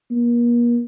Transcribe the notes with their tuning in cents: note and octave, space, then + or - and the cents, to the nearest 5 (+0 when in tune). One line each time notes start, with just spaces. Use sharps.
A#3 +40